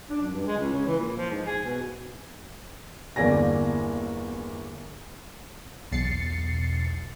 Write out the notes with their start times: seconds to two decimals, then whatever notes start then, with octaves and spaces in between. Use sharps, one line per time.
0.10 D4
0.21 F#2
0.33 G2
0.46 G#3
0.58 C#2
0.72 C#3
0.86 E3
0.99 A#2
1.15 F3
1.31 G#2
1.45 G#4
1.64 B2
3.16 G1 E2 A#3 D5 G#5 A#6
5.92 B1 E2 A6 C7 C#7